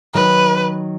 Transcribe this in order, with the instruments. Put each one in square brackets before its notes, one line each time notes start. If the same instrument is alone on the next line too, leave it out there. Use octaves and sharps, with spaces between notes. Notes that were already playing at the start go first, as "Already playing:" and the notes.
[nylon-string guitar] D#3 F#3 [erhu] B4